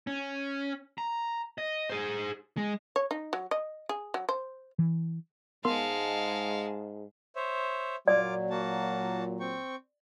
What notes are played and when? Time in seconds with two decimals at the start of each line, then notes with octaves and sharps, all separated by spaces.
0.07 C#4
0.98 A#5
1.58 D#5
1.89 G#4 C5
2.57 G#3
2.96 C#5
3.11 D#4
3.33 F#3
3.51 D#5
3.89 G#4
4.14 F#3
4.29 C5
4.79 E3
5.65 G#2 G#3 B3 A#4 F5 A5 C6
7.36 C5 C#5 E5
8.08 A#2 F#3 F4 D5 D6
8.50 A#3 F#4 A5
9.40 C4 G5 C#6